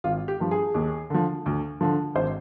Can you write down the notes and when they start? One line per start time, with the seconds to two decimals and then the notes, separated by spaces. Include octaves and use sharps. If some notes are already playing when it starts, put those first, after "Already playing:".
0.04 G#1 F4
0.28 G4
0.40 G2 F3
0.51 G#4
0.74 D#2
1.10 D3 F3
1.46 D2
1.81 D3 F3
2.15 G#1 C5